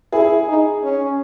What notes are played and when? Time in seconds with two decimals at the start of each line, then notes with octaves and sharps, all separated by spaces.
0.12 E4 G#4
0.48 D#4
0.83 C#4